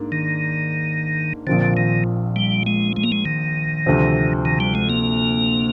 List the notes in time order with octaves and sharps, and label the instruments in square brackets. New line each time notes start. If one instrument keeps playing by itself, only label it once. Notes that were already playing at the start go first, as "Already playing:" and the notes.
Already playing: [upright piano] G#2 A#3 D4
[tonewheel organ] D#3
[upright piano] A#1 A#2 F3 C4 [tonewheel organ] D3
[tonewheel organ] D#3
G3
G#3
G#3
A#3
G#3
D#3
[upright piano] D2 C3 F3 C4
[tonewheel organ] D#3
G3
G#3
A#3